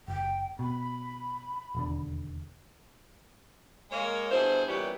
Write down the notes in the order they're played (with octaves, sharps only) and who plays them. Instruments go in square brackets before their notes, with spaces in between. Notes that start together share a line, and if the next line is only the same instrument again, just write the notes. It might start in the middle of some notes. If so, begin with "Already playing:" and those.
[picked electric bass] F#1 [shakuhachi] G5
[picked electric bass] B2 [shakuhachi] B5
[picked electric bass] E1 D#2 D3
[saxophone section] G#3 A#3 C#5
G2 B2 E4 G#4 C5
A#2 E3 G3 B3 C#4 G4